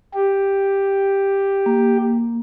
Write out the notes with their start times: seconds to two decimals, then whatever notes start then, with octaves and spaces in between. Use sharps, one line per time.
0.14 G4
1.66 A#3